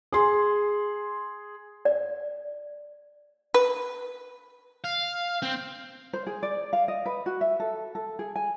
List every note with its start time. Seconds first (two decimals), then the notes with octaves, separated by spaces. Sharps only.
0.12 G#4 C6
1.85 D5
3.54 B4
4.84 F5
5.42 C4
6.13 C5
6.27 G#4
6.43 D5
6.73 F5
6.88 D#5
7.06 B4
7.26 F#4
7.41 E5
7.60 A4
7.95 A4
8.19 G#4
8.36 G#5